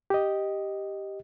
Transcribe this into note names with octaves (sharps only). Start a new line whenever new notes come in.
G4 D#5